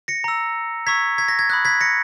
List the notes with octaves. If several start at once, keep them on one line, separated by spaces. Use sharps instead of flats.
A#6 C#7
A#5 E6
A#5 C#6 E6 G#6 B6
G#6 B6
A#6
G#6
B5 D#6 F#6 G#6
G#6 B6
A#6 C#7